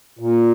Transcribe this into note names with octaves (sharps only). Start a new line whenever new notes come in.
A#2